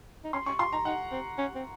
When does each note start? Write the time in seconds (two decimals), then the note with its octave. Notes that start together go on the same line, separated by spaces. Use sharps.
0.24 D#4
0.33 C#4 C6
0.46 C#4 C#6
0.59 F4 C6
0.73 D#4 A#5
0.85 D#4 F#5
1.11 C4
1.38 C#4
1.55 C4